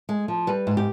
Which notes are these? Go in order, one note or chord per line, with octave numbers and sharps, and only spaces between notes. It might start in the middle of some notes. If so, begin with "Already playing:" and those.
G#3
F3
G3 B4
G#2
G4